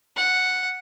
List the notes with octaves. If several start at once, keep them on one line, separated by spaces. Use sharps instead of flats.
F#5